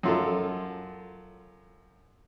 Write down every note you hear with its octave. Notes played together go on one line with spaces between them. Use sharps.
F#2 F4 A4